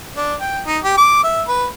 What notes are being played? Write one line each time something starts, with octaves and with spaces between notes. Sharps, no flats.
D4
G5
D#4
G4
D6
E5
B4